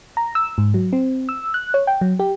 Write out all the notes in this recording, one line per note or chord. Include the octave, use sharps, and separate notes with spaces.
A#5
E6
G#2
F#3
C4
E6
F#6
C#5
G5
F#3
G4